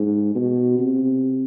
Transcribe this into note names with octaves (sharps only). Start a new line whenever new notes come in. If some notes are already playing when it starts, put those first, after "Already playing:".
Already playing: G#2
B2
C3